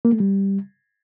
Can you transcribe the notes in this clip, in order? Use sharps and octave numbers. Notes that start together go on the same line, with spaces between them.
A#3
A3
G3